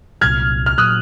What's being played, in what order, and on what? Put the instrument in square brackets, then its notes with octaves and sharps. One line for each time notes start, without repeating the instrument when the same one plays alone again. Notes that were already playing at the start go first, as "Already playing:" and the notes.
[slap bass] C2 A#2 F#3 [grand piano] F6 G#6
[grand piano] F6
[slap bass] A#2 F#3 [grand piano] D#6 F#6